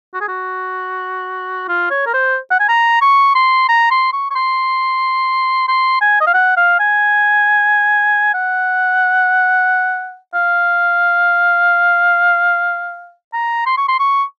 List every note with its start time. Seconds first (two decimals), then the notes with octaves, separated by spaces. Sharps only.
0.14 F#4
0.21 G#4
0.28 F#4
1.68 F4
1.90 C#5
2.07 A#4
2.14 C5
2.51 F#5
2.60 G#5
2.69 A#5
3.02 C#6
3.35 C6
3.69 A#5
3.91 C6
4.13 C#6
4.31 C#6
4.35 C6
5.68 C6
6.01 G#5
6.21 D#5
6.27 F5
6.34 F#5
6.57 F5
6.79 G#5
8.34 F#5
10.34 F5
13.33 A#5
13.66 C6
13.77 C#6
13.89 C6
14.00 C#6